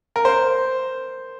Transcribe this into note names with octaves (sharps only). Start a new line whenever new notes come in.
A#4
C5